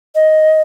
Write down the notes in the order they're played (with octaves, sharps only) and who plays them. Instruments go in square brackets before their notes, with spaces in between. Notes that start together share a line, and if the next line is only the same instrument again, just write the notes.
[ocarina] D#5